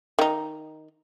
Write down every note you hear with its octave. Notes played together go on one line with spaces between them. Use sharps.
D#3 D#4